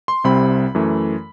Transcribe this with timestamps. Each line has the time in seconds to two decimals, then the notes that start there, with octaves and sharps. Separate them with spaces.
0.08 C6
0.24 C2 C3 G3 C4 B5
0.75 F#2 E3 A3